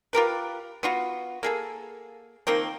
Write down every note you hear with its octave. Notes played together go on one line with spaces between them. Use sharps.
F4 G4 A#4 B4
B3 F4 F#4
A#3 G#4 A4
D#3 F3 A#3 C4